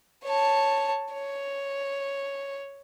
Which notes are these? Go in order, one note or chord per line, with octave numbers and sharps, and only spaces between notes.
C#5 A5
C#5